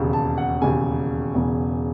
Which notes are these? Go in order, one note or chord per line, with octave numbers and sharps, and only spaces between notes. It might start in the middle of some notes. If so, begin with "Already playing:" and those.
Already playing: E1 D#2 C#3
A5
F#5
E1 D#2 C#3 G#5
E1 E2 C#3